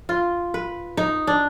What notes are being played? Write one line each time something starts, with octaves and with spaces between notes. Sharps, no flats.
F4
B4
D#4
D4